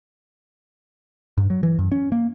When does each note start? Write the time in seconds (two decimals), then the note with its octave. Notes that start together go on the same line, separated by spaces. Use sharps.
1.38 G2
1.50 F#3
1.63 E3
1.79 F#2
1.92 C#4
2.12 A#3